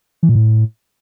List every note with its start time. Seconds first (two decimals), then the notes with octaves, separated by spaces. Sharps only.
0.23 E3
0.29 A#2
0.35 A2